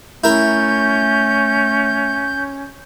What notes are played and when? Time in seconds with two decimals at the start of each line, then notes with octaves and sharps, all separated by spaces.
0.24 A3 C#4 E4 A#4 G6